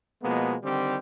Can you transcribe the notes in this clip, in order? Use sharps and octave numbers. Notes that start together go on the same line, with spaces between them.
B2 F3 G#3 A#3 B3
D3 D#3 G3 C4 G4